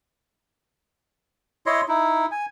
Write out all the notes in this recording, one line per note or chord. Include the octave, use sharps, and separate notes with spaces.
E4 C#5 D#5 C6
D#4 E4
G#5